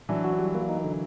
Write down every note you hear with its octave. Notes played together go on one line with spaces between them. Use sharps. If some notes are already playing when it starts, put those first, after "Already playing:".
E3 F#3 D4
F#4
G3
A#3
D#4
D3